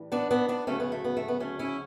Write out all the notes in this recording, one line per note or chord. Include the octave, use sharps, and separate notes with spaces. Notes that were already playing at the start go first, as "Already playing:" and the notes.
Already playing: A2 E3 G3
B3 D4
B3 D4
B3 D4
D2 C#3 F#3 A3 C#4
B3
A3
B3
A3
B3
A3 C#4
C#4 E4